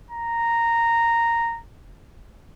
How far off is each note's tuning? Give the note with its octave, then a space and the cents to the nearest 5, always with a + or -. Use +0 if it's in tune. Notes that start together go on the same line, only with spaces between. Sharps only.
A#5 -5